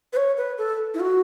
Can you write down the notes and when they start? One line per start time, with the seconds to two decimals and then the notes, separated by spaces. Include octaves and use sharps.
0.13 B4
0.17 C#5
0.37 B4
0.58 A4
0.94 E4
1.00 F#4